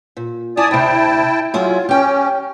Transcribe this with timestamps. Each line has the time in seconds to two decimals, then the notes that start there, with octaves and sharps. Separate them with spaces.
0.17 A#2
0.57 E4 D5 G#5 A5 D#6
0.71 D2 C3 E4 G5 A5
1.54 F#3 E4 F4 G#4
1.89 C#4 G4 G5